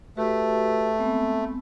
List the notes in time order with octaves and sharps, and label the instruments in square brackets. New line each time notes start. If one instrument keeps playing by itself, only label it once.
[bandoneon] A3 [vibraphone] F#4 G4 B4
[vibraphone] G#3 B3 C4